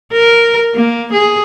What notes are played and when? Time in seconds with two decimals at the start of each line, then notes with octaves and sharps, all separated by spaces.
0.12 A#4
0.75 A#3
1.13 G#4